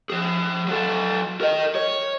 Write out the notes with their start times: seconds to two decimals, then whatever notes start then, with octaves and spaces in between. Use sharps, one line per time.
0.10 F3 G#4
0.68 F#3 A4
1.41 A#4 D#5
1.75 C#5